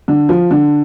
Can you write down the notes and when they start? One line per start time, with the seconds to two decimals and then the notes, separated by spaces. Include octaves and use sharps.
0.08 D3
0.29 F3
0.51 D3